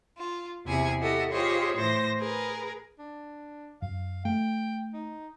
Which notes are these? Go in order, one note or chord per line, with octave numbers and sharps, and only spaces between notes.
F4
E2 C3 E4 G#4 G#5
E4 F#4 G4 A4 D#5
F4 G4 G#4 C5 C#5 D#5
A2 E3 C5 A#6
G#4 A#4 B4
D4
F#2 F5
A3 G5
D#4